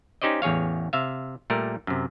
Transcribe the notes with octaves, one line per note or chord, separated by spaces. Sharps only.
C#4 D#4 G4 C5 D5 D#5
A1 E2 G#4 C#5 F5
C3 E5 F5
A#2 G3 A3 A#4
F#2 C3